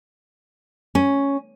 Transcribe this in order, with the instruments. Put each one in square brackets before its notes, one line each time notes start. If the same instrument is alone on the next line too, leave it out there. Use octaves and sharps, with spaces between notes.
[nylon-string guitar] C#4